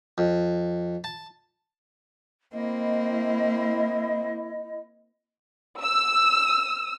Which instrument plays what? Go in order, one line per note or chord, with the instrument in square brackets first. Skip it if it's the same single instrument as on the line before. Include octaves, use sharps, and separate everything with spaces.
[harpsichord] F2
A5
[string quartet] A#3 C4 [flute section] E4 D#5
[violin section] E6